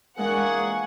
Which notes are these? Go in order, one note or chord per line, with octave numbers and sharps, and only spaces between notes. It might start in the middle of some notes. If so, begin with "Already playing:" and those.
A#2 E3 G#3 A#3 D4 G#4 F#5 C#6